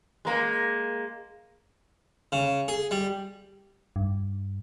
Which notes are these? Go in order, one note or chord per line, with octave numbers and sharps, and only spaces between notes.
G#3 A#3
C#3
G#4
G3
G2